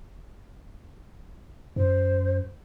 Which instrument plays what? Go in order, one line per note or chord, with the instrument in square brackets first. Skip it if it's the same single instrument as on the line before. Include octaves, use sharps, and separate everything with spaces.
[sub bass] F#2 [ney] C5